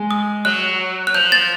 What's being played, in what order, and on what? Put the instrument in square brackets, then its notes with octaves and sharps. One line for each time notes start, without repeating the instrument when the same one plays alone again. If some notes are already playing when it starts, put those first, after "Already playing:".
Already playing: [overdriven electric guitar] G#3
[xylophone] D#6
[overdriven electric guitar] F#3 [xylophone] F#6
[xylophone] F#6
[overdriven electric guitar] F3 [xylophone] G6
[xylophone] A6